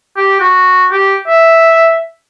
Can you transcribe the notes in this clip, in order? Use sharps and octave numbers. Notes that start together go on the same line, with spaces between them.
G4
F#4
G4
E5